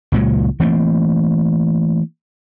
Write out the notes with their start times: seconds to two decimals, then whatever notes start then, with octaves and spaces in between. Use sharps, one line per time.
0.12 C#2 A#2 F#3 G#3
0.60 E3 A3 A#3 C4